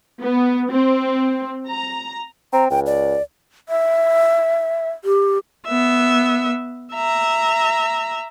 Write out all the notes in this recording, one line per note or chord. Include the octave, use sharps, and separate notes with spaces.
B3
C4
A#5
C4 A#5
C#2 G5
D5
E5
G4
B3 E5
E5 A#5